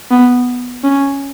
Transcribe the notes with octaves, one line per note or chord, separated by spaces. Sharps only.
B3
C#4